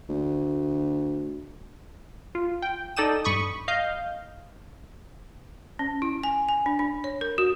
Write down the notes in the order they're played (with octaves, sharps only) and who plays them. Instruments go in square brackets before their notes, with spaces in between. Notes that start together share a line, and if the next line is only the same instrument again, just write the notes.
[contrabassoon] D2
[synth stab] F4
G5
D#4 A4 D5 G5 D#6 E7
G2 B5 C#6 D#6
D#5 F5 G6
[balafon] C#4
E4
G#5
G#5
D4
D4
C#5
A#4
F#4